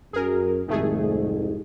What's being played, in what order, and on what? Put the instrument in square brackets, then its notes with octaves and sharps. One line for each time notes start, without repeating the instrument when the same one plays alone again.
[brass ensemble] F#2 [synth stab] G#4 A#4
[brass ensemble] C2 F2 G#2 [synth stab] D#3 A3 G#4